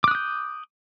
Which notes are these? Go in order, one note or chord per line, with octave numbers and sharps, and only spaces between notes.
D6 D#6 F#6 G6